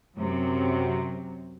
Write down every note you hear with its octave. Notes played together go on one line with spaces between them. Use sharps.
F#2 C3 F#3